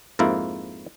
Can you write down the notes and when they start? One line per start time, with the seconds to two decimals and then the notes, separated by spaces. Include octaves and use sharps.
0.19 F2 G#2 A#3 E4 F4